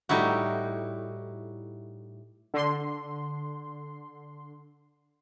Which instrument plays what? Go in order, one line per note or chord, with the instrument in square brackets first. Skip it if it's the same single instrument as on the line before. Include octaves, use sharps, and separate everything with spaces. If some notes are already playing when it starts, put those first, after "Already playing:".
[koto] A2 G3 D#4 E4 F#4
[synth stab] D3 C6